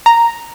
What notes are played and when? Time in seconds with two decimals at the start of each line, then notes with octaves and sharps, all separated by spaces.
0.06 A#5